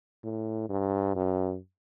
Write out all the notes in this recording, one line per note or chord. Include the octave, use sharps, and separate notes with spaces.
A2
G2
F#2